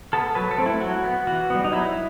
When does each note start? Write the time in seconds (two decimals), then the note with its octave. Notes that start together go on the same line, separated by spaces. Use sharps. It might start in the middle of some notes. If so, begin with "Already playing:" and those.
0.13 B3 A4
0.35 F#3 B4
0.51 A4
0.58 A3 C4
0.66 E4
0.81 F#3 F#4
1.04 B3
1.27 E3 F#4
1.50 G3 B3
1.64 D#4
1.72 F#3 E4